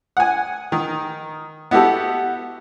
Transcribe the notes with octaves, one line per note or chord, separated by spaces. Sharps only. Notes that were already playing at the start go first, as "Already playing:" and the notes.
F#5 G#5
D#3
B3 E4 F#4 G4 A4